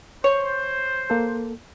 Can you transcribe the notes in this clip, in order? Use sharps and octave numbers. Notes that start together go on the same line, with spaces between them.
C5 C#5
A#3 A4